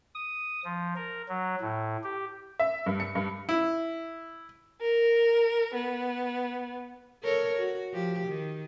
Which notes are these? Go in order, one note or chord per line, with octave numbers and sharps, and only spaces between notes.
D#6
F3
A#4
F#3
A2
G4
E5
G2
C#7
G2
E4
A#4
B3
A4 A#4 C#5
F#4
F3 G4
D#3